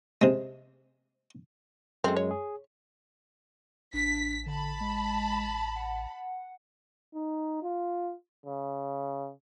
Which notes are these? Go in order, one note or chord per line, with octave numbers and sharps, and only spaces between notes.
C3 G#3
F#2 G#3 A3 C4
C#5
G#4
A1 D4 B6
D3 A5 B5
G#3
F#5
D#4
F4
C#3